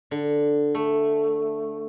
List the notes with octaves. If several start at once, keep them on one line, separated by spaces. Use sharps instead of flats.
D3
A3